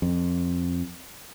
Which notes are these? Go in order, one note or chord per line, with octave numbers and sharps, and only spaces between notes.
F2